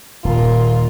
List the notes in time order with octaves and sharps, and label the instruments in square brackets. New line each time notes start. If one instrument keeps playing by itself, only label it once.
[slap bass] D#1 [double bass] A#2 [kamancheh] F4 A#4